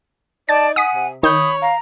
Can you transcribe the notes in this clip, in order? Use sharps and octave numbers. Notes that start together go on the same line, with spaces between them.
D#4 D5 A5 A6
F#5 G#5 D#6 B6
C3
D#3 C#5 B5 D#6 G6
F5 A#5